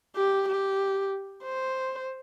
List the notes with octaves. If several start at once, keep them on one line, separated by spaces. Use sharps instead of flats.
G4
G4
C5